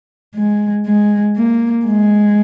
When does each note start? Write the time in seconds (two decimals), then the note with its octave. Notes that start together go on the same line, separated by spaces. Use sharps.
0.35 G#3
0.86 G#3
1.36 A#3
1.86 G#3